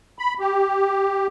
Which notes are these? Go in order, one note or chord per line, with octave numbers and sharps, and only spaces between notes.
B5
G4